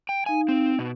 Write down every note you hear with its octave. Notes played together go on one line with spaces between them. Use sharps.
G5
D#4 F5 G#5
C4
B2